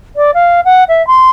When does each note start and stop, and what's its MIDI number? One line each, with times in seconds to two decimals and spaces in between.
0.16 0.31 74
0.34 0.61 77
0.65 0.84 78
0.88 1.05 76
1.07 1.31 84